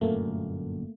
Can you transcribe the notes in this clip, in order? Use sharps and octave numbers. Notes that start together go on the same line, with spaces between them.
G1 F#2 A#2 A3 A#3